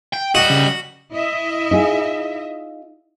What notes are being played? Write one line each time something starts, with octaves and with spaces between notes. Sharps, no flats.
G5
G3 F#4 D#5
C#3
E4 D#5 E5
D#4 F4 G#4